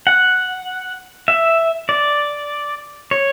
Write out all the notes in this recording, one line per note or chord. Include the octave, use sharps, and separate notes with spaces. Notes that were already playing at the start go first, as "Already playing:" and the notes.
F#5
E5
D5
C#5